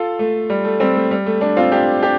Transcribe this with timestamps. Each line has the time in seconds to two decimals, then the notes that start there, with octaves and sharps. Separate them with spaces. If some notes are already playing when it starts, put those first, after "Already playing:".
Already playing: F4 A4
0.19 A3
0.50 G3
0.64 A3
0.80 G3 C4
0.95 A3
1.11 G3
1.26 A3
1.41 A3 D4
1.57 C4 F4
1.72 D4 G4
2.02 D4 G4